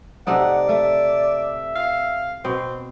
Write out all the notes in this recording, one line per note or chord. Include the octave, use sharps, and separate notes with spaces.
C3 A3 D#4 D5 F#5
A3 E5
F5
B2 C4